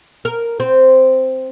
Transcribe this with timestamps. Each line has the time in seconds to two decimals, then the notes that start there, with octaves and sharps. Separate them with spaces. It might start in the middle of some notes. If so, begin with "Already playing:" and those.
0.25 A#4
0.60 C4